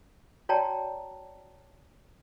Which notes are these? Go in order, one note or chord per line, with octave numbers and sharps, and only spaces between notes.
F#4 C#5 D5 G5 A5 A#5